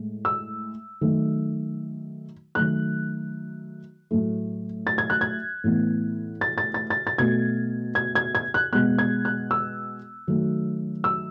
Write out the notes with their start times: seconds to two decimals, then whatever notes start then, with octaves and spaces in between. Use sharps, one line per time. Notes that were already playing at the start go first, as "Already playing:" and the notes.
Already playing: A2 G#3
0.25 E6
1.01 D#3 F#3 A3
2.55 D#3 F#3 A3 F#6
4.11 A2 F#3 A3
4.87 A6
4.98 G#6
5.10 F#6
5.21 G#6
5.64 A2 E3 B3
6.41 A6
6.58 A6
6.74 A6
6.90 A6
7.07 A6
7.18 B2 A3 G#6
7.95 G#6
8.15 G#6
8.35 G#6
8.54 F#6
8.72 B2 G#3 B3 F#6
8.99 G#6
9.25 F#6
9.51 E6
10.27 D#3 F#3 A3
11.04 E6